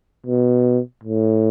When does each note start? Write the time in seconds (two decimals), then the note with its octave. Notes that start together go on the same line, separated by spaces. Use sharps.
0.26 B2
1.03 A2